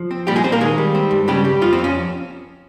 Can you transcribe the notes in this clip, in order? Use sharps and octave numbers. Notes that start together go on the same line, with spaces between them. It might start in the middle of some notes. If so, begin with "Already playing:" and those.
Already playing: F3
C4
A#2 G3 G4
G#3 G#4
A#2 C4 C5
A#3 A#4
D#3 G#3 G#4
G3
C4
G2
C#3 G3 G4
G3
F2 F3 F4
C4
F2
C#4